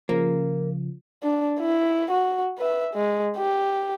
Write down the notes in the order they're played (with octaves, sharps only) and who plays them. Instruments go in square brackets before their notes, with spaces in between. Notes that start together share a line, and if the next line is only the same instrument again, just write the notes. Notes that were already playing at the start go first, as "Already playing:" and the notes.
[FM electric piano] C#3 F3 [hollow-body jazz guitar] A#3
[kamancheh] D4
E4
F#4
B4 E5
G#3
G4